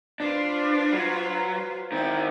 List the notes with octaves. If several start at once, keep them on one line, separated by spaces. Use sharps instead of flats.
D4 F4 B4 C5
F#3
D#3 C4 E4